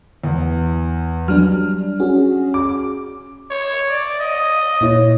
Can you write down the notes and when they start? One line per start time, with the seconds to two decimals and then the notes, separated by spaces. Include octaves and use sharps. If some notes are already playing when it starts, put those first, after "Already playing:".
0.24 E2
1.28 F#3 G3 D4 F6
2.00 C#4 F#4 G#4
2.54 D6
3.51 C#5
3.90 D5
4.19 D#5
4.81 A#2 E4 C#5